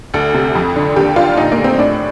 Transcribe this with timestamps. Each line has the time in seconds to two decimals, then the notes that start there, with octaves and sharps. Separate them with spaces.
0.14 D2 A4
0.34 C3
0.55 F2
0.76 D3
0.96 D#2 G4
1.16 D3 F4
1.37 A#2 D#4
1.52 A#3
1.58 A3
1.64 C4
1.78 A2 D4